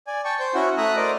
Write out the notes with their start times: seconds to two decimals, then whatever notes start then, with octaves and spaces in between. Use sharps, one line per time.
0.07 D5 G#5
0.25 G5 A5 C#6
0.40 C5 G6
0.55 C#4 E4 F#4 F#5
0.77 A3 E5 A#5 D#6 F#6
0.97 A#4 C5 D5 D#5 D6